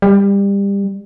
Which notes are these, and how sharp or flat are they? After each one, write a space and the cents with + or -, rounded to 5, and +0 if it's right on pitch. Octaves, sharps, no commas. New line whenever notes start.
G3 +25